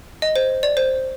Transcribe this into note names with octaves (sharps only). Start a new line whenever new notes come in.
D#5
C5
D5
C5